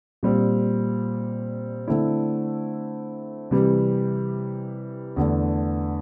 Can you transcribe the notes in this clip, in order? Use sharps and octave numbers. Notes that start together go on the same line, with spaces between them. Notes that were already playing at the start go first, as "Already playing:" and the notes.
A#2 G3 C4
D3 A3 C4 E4
C3 E3 G3
E2 D3 A3